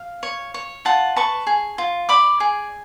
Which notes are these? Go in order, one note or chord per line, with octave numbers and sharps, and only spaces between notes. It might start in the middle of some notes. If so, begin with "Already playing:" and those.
Already playing: F5
C#5
C#5
F4 F#5 A5
B4 A5 C#6
G#4
F4
D5 B5 D6
G#4